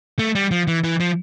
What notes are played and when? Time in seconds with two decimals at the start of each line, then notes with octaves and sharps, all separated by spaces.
0.19 A3
0.35 G3
0.51 F3
0.67 E3
0.84 E3
1.00 F3